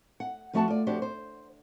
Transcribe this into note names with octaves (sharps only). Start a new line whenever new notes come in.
F#5
F2 F3 A3 F#4 F#5 A5
F4 D5
F2 D4 F#4 G4 C5
C5